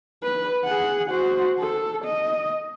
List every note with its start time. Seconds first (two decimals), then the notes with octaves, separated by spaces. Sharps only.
0.23 B4
0.65 G#4 F#5
1.10 F#4 C5
1.60 A4
2.05 D#5